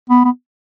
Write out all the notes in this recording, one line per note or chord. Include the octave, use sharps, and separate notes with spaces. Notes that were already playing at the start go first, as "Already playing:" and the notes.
B3
B3